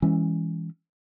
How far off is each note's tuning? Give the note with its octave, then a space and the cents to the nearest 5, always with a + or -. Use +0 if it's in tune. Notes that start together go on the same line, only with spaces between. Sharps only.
E3 +0 G#3 -30 C#4 +0